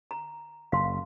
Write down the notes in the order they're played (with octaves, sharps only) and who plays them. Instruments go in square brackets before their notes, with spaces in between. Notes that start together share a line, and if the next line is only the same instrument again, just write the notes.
[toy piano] A#5
[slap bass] F#1 [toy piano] F5 C6